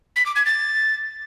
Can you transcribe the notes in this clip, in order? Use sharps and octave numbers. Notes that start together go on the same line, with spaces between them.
B6
D6
G#6
A6